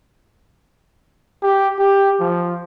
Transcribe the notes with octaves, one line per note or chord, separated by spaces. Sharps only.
G4
G4
F3